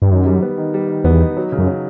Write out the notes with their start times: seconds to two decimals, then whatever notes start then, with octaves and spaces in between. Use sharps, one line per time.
0.02 G2
0.11 F#2 D#3
0.26 G3
0.42 B3
0.58 D#3
0.74 G3
0.89 D#3
1.04 E2 B3
1.21 D#4
1.37 F#3
1.52 C#3
1.59 F#2
1.67 F#3